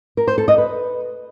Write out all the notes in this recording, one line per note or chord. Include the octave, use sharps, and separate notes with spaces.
A#4
C5
A4
D#5
B4